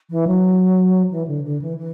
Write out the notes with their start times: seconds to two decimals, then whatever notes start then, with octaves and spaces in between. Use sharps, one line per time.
0.09 E3
0.27 F#3
1.10 E3
1.27 D3
1.44 D3
1.61 E3
1.77 E3